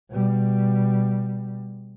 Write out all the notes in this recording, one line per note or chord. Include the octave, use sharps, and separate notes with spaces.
B2 G3